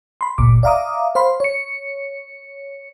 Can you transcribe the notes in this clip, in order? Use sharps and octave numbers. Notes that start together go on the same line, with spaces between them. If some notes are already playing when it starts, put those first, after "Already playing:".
B5 C6
G1 D2 A#2 D6
D5 E5 F5 A#5 D6 D#6
C5 F5 B5 C6
C#5 C#7